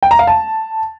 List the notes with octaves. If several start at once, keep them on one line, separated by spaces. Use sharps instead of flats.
G5
A#5
F5
A5